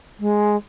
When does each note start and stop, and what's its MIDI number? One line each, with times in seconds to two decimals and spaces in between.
0.20 0.56 56